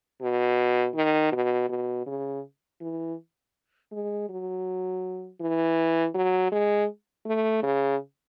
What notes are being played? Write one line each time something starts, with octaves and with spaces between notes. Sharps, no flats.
B2
D#3
B2
B2
C#3
E3
G#3
F#3
E3
F#3
G#3
A3
C#3